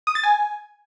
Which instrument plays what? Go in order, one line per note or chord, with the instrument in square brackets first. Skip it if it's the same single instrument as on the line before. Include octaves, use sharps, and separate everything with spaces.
[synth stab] D#6
A6
G#5